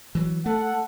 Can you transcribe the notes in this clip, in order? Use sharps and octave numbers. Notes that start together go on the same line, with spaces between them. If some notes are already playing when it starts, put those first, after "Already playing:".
E3 F#3
A3 A4 F#5